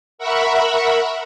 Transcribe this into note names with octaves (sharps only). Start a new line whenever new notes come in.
A#4 E5 F#5 B5 C#6